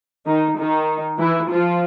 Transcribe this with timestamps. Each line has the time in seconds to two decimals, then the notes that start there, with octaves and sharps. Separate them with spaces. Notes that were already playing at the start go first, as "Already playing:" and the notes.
0.26 D#3 D#4
0.57 D#3 D#4
1.18 E3 E4
1.49 F3 F4